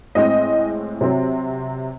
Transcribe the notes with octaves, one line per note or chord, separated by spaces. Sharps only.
A2 G#3 C4 D#5
C3 F#3 C4